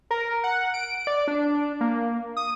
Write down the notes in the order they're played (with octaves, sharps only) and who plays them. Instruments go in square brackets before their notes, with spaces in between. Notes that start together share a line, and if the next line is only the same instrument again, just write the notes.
[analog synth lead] A#4
F#5
D7
D5
D4
A#3
D#6